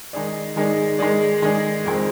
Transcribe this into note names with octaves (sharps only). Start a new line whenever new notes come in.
D#3 G#3 D#4 G#4 D5
D#3 G#3 D#4 G#4 D5
D#3 G#3 D#4 G#4 D5
D#3 G#3 D#4 G#4 D5
F2 D#3 G#3 C4